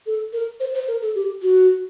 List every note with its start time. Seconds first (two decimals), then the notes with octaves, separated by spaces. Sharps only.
0.06 A4
0.33 A#4
0.60 C5
0.74 C5
0.87 A#4
1.01 A4
1.15 G4
1.42 F#4